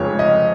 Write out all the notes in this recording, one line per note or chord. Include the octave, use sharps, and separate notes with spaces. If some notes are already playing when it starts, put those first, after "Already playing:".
Already playing: F1 F2 C#3 F3 G#3 C#5
D#5